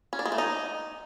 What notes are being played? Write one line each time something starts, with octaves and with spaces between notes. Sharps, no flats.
C#4
D4
G#3
A3
D#4